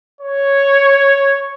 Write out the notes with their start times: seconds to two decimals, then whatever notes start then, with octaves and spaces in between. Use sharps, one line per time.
0.21 C#5